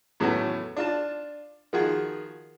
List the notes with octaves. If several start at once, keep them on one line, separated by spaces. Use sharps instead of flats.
E2 A2 F#3 A3 B3 C#4
D4 F4 A5
D#3 F3 F4 F#4 G#4